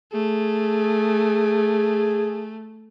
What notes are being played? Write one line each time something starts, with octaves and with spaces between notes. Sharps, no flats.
A3 G#4